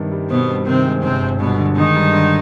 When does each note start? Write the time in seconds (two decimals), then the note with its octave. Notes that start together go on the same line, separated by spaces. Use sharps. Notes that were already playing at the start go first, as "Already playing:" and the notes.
Already playing: G2 C3 D#3 D4
0.12 G3
0.30 B2 B3 C4
0.48 G2
0.66 C3 D#3 C4
0.85 G#3
1.03 G1 C3 C4
1.22 G1
1.40 G2 B2 B3
1.58 D3
1.76 D#3 G#3 D#4
1.95 G2
2.13 D3